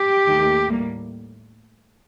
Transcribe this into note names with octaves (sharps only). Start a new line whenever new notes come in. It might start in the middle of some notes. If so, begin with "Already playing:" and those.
Already playing: G4
D#2 D#3 A3
A2 G3 A#3